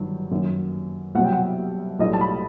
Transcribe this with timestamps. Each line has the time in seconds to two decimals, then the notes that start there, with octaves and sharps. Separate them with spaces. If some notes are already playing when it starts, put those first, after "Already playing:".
Already playing: G1 G2 D#3 F#3
0.31 F#2 D#3 F#3
1.15 C2 B2 F#3 F#5
1.24 G5
1.32 F#5
1.99 B1 A2 G3 D#5
2.13 A5
2.21 B5